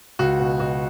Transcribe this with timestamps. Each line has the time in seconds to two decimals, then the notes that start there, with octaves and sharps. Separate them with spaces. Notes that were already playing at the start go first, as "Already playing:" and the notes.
0.19 C#2 F#4
0.40 B2
0.60 B2 F#4